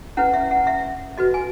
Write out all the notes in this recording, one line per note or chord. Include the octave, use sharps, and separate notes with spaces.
C#4 E4 B4 F#5
E5
F#5
E5
F#4 B4 D#5
G#5